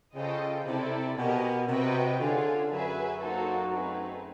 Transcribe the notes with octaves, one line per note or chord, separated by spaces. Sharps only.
C#3 F4 A4 C5 D#5 G5
C3 C4 E4 A4 D5
B2 G4 A#4 D#5 G#5
C3 F#4 B4 D#5 G5
D3 C#4 F4 G#4
F#2 F#3 G#4 B4 E5 G#5
A#3 D#4 F#4 A4 C5
A3 C4 D#4 G#4 B4